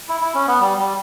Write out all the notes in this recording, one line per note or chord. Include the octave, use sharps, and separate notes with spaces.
E4
E4
C#4
B3
G3
G3